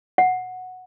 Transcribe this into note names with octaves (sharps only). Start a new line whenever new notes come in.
F#5